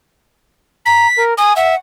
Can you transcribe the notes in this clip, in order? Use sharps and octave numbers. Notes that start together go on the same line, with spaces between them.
A#5 B6
A#4
G#5 D#6
E5 F#5